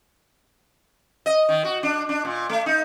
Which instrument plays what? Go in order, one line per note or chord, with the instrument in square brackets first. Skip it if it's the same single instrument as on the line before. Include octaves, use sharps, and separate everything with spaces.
[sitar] D#5
D#3
F#4
D4
D4
A#2
A3
D#4